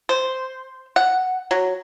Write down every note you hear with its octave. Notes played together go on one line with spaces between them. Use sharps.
C5
F#5
F#3